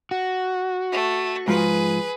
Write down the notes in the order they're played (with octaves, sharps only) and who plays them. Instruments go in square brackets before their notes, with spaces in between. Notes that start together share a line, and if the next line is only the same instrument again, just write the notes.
[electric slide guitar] F#4
[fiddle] A3
[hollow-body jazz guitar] G#2 F3 [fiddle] G#4 B4